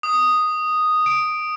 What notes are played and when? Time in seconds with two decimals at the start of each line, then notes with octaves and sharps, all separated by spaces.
0.03 D#6
1.06 D7